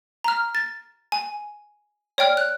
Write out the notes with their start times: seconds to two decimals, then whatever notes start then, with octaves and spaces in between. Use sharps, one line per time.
0.24 A#5 F6
0.55 A6
1.12 G#5
2.18 C#5 D5 G5 F6
2.37 F#6